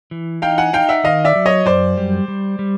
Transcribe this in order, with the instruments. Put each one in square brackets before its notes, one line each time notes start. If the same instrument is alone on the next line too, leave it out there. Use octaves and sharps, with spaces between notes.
[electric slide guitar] E3
[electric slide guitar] D#4 [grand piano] F5 G5
[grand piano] F#5 G#5
[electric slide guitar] D#4 [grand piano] F5 G5
[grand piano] E5 F#5
[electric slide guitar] D#3 [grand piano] D#5 F5
[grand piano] D5 E5
[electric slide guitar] F#3
[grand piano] C#5 D#5
[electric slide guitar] F#2 [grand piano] C5 D5
[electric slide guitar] G3
G3
G3